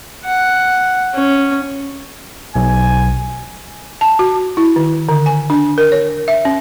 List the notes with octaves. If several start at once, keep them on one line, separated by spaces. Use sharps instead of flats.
F#5
C#4
B1 G#5
A5
F#4
E4
D#3
D3
G#5
D4
A#4
C#5
E5
C#4